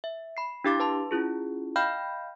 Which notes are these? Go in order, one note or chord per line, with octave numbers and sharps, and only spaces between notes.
E5
B5 C7
D4 E4 G4 F5 D6 A6
B4 A5 C6
C#4 E4 F4 G#4
D#5 F5 G5 B5 F6 G6